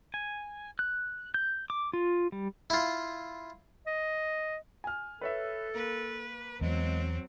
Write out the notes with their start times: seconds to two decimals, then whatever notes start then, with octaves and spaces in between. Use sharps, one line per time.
0.14 G#5
0.79 F#6
1.34 G6
1.70 D6
1.93 F4
2.32 G3
2.70 E4 F4
3.86 D#5
4.84 G#5 F6
5.21 A4 B4 C#5 E5
5.74 A#3 B4
6.61 E2 F#3 G#3 C4